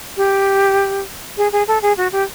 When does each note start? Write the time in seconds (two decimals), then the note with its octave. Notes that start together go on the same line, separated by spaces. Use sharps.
0.17 G4
1.37 G#4
1.52 G#4
1.68 A4
1.82 G#4
1.97 F#4
2.12 G4